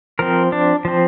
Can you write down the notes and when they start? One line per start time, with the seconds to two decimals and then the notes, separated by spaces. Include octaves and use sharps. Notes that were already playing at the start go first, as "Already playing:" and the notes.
0.19 F3 C4 A#4
0.52 D4
0.85 F3 C4